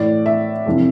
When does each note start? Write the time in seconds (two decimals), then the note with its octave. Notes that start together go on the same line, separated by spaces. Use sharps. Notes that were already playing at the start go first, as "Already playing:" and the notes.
Already playing: A2 E3 D5
0.26 E5
0.66 F2 C3 E3